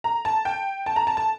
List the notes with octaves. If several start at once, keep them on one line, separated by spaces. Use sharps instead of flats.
A#5
A5
G5
A5
A#5
A5
A5